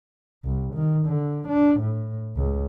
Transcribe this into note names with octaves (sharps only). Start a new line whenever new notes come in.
C2
D#3
D3
D4
A2
C#2